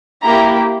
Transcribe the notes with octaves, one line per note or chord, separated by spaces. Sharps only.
A#3 E4 G4 A#5